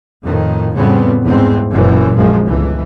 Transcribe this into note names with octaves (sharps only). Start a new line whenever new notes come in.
F2 A2 D#3
F2 A2 C#3 G3 B3 C4
E2 G#2 C4
F#1 F#2 A#2 E3
A#1 F#2 F3 G#3
G1 C#2 E3